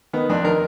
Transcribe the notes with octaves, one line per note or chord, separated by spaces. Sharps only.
D#3 B3
F2 D4
D#3 A#4